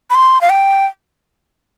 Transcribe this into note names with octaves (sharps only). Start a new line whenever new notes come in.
B5
C6
F5
G5